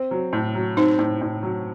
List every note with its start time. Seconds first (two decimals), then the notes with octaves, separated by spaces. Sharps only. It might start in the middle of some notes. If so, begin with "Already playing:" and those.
Already playing: C4
0.11 F#3
0.33 A2
0.55 F#3
0.77 C4 D#4
0.99 A2
1.21 A2
1.43 F#3